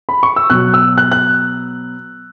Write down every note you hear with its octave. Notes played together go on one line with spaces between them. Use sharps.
B5
C#6
E6
B2 F#3 F#6
E6
F#6
F#6